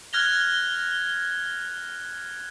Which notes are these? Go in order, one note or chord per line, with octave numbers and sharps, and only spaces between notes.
F6 F#6 G#6 A#6 F7 G7